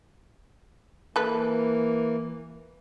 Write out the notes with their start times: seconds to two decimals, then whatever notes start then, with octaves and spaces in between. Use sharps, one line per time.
1.16 E3 A#3 A4 B4